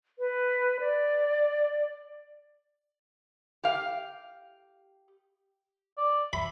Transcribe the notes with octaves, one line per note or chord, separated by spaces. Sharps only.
B4
D5
G4 F5
D5
E5 B5